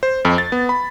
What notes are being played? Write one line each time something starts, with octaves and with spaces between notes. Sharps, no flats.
C5
F2
A6
B3
B5